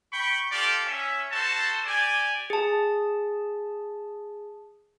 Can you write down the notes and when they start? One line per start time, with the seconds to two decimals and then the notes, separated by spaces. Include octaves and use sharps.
0.12 G5 B5 C#6
0.52 F4 G4 A4 D5
0.86 C#4 E5
1.32 F#4 A4 C5 A5
1.86 G4 D5 G#5
2.50 G#4 A5